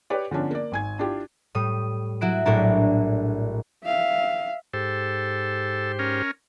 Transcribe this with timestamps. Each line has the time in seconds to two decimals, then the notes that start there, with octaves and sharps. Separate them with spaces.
0.10 G4 B4 C#5 D5
0.31 D3 F3 B3 C#4 D4
0.51 A#3 D5
0.72 G#1 G#5 G#6
0.99 D4 E4 F4 G4
1.55 A2 G3 D#6
2.21 F#3 E4 F#4 D7
2.46 A#1 A2 D4 E4 A4 A#4
3.85 E5 F5
4.73 G#2 G4 A4 C5
5.99 C#4 A#4